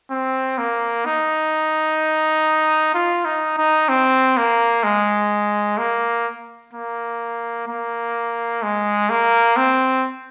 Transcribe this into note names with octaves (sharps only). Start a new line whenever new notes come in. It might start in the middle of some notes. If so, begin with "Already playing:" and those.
C4
A#3
D#4
F4
D#4
D#4
C4
A#3
G#3
A#3
A#3
A#3
G#3
A#3
C4